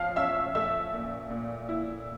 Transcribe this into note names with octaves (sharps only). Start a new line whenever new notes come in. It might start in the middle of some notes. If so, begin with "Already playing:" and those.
Already playing: F3 F5 F6
C#4 E5 E6
A3 E5 E6
A#2
A#2
E4